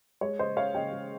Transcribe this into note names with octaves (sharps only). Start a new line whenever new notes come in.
G#3 C#5
C#3 C5 D#5
C#4 C#5 F5
C#3 D#5 G5
G#3